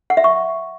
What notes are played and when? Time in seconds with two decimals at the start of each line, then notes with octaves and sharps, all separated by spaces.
0.10 F#5
0.17 E5
0.24 C#6